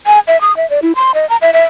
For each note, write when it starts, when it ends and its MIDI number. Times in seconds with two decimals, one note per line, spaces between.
0.07 0.19 80
0.28 0.39 76
0.41 0.55 87
0.57 0.68 76
0.70 0.80 74
0.82 0.92 64
0.96 1.12 84
1.15 1.28 75
1.29 1.37 82
1.42 1.51 76
1.53 1.63 76